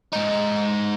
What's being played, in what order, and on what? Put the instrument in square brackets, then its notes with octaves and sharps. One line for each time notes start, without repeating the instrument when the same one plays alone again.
[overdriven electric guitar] G#2 D#4